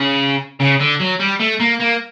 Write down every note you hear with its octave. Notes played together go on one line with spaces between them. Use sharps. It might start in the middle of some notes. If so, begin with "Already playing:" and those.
Already playing: C#3
C#3
D3
F#3
G3
A3
A#3
A#3